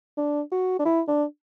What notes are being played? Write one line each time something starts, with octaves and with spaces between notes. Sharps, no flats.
D4
F#4
D4
E4
D4